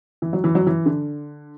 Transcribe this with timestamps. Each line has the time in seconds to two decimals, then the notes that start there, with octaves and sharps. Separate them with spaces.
0.22 E3
0.33 F#3
0.44 E3
0.55 F#3
0.67 E3
0.86 D3